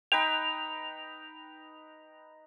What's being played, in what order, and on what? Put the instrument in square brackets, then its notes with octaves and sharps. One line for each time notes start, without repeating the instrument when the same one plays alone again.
[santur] D#4 B4 G5 [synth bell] F7